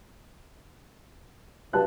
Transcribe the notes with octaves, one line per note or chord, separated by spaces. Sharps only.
G2 F#3 A5 F#6